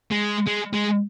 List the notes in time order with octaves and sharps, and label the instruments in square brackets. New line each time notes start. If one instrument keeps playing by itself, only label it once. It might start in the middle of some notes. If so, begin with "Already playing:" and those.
[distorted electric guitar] G#3
G#3
G#3